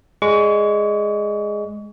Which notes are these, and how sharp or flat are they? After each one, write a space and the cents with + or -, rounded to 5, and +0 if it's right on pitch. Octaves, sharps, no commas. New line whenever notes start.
G#3 +0 D5 +0 C#6 +35